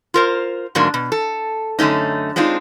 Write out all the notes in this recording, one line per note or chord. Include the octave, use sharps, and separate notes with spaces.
F4 A#4 C5
G#2 D3 F#3 A#3 D4
B2
A4
F#2 D3 A3 C#4 D#4
G#3 C4 D4 D#4 F4